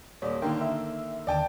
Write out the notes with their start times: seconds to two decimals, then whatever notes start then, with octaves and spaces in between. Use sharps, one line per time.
0.22 D#1 C#5 D5
0.42 D3 D#3 A#3 A#4 G5 C6
0.61 E5 E6
1.27 D#2 D3 D5 G5 A5